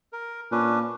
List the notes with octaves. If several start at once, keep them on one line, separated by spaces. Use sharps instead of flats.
A#4
A#2 C#4 D4 B4